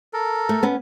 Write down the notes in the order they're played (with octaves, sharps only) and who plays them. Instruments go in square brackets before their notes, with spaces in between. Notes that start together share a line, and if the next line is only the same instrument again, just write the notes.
[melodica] A4 A#4
[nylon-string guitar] A3
B3 C#4